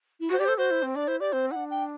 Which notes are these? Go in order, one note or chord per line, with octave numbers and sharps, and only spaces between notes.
E4
F#4 C5
G4 D5
A4 C5
F#4 C5
E4
C4
D4 D5
E4 C5
G4 D5
C4 C5
D4 E4 F#5
G5